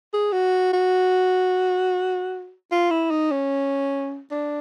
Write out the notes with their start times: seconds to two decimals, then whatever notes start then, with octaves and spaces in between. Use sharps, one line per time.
0.13 G#4
0.32 F#4
0.73 F#4
2.71 F4
2.91 E4
3.11 D#4
3.31 C#4
4.31 D4